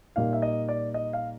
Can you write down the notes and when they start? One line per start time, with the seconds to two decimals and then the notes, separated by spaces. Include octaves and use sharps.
0.16 A#2 G3 A#3 D#4 F5
0.33 E5
0.42 D#5
0.69 D5
0.94 D#5
1.13 F5